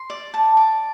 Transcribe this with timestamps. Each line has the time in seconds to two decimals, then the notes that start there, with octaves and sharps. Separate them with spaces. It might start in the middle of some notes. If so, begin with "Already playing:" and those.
Already playing: C6
0.10 D5
0.34 A5
0.57 D5